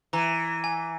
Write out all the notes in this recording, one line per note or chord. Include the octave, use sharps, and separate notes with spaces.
E3 A#5
G#5